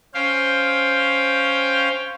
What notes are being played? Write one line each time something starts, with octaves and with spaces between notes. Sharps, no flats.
C#4 C5 F5 G5